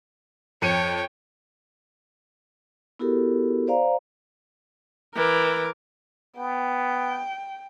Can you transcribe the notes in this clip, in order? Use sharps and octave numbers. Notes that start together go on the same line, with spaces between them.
F2 C#5 G5 C#7 D#7
B3 E4 F#4 G4 A4 A#4
C5 D5 F5 A#5
E3 A#4 D6
B3 G5